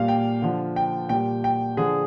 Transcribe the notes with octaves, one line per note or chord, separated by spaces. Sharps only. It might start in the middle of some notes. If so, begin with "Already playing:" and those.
Already playing: A#2 G3 F5
G5
D3 F3
G5
A#2 G3 G5
G5
D3 F3 G#4